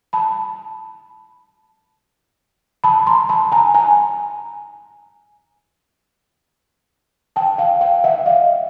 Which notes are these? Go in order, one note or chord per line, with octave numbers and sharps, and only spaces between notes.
A5 B5
A5 B5
A#5 C6
A5 B5
G#5 A#5
G#5 A#5
G5 A5
F5 G5
F5 G5
E5 F#5
D#5 F5